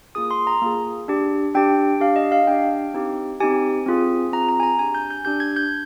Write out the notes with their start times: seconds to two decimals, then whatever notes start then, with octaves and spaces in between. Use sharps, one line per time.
0.15 A#3 F4 G#4 D#6
0.31 C6
0.47 A#5
0.62 A#3 F4 G#4
1.08 D4 G4
1.55 D4 G4 G5
2.00 D4 G4 F5
2.16 D#5
2.32 F5
2.47 D4 G4 G5
2.94 C4 D#4 G4
3.40 C4 D#4 G4 G#5
3.86 C4 F4 G#4
4.32 C4 F4 G#4 A#5
4.49 A#5
4.60 G#5
4.63 A#5
4.79 D4 G4 G#5
4.95 G6
5.10 G6
5.25 D4 G4 G6
5.40 G#6
5.56 G6